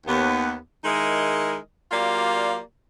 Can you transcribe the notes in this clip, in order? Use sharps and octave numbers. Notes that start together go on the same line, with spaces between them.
D#2 B3
D#3 G#3 D#4 E4 A#4 D#5
F#3 A#3 F4 G4 D5